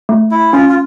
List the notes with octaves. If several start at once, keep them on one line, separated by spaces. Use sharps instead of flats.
A3
E4
C#4 F4
F4